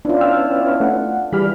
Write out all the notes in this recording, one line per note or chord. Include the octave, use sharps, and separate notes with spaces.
B3 C#4 D4 E4 F4
G5 E6 F6
A3 F#5
E3 G3 G4 G#4 D5 B5 F6